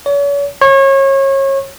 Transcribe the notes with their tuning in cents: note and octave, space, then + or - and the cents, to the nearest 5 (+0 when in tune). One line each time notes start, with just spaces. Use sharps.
C#5 +40
C#5 -30